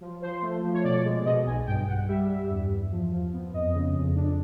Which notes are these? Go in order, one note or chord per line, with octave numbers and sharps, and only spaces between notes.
F3
F3 C5
A3
F3
C#5
B2 D5
G#3
B2 D#5
B1 G#5
G2 G5
G2 F#5
G3 E5
G2
E2
E2
F3
F3
B3
F2 D#5
C#3
F2
D4